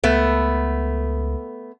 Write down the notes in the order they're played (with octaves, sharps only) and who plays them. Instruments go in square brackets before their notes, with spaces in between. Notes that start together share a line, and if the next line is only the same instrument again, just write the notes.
[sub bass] C#2 [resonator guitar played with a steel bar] A3 B3